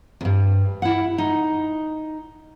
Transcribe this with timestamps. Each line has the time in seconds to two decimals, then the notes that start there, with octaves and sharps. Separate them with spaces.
0.21 E2 G2
0.82 E4 F#5
1.18 D#4